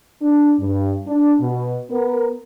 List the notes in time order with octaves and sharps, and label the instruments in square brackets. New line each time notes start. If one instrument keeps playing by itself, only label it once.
[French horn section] D4
G2
D4
B2
B3 A#4